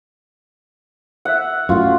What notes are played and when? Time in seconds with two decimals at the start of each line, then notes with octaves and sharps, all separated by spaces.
1.25 E5 F#5
1.69 F#2 A2 F4 F#4